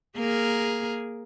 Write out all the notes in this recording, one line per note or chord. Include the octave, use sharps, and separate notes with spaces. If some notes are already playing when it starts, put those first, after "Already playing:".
A#3 G#4 A#4